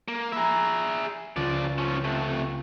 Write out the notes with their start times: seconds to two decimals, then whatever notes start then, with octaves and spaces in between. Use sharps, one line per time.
0.08 A#3
0.32 G#4 E5 A#5 B5
1.36 C#2 F3 D5
1.78 F3 C#4
2.04 C3 A3